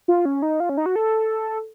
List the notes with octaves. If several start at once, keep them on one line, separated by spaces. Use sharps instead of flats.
F4
C#4
D#4
F4
C#4
D#4
F#4
A4